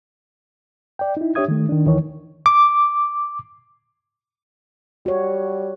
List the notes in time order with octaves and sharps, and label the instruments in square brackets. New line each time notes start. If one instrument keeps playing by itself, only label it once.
[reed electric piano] D5 G5
D#4 E4
D4 G4 C#5 E5 D#6 G#6
D#3 A3
D#3 D4
D#2 D#3 E3 C#5
D6
[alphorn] G3 [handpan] F#4 C#5